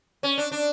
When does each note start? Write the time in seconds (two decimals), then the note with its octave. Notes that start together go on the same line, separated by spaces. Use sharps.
0.23 C#4
0.38 D4
0.52 D4